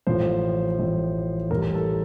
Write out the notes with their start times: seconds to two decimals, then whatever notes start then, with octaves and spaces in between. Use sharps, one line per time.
0.07 A1 A2 F3 C5
0.78 A1 A2 F3
1.50 A1 A2 G3 A#4
1.62 A#4
1.74 A4